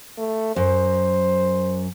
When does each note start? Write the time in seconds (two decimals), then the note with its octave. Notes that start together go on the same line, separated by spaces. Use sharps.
0.18 A3
0.56 F#2 C5